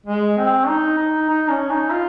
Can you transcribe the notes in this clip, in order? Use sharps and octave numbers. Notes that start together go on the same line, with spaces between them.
G#3
C4
D#4
D#4
D#4
C#4
D#4
F4